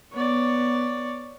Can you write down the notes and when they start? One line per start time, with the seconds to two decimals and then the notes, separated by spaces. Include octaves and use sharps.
0.13 B3 C#5 D5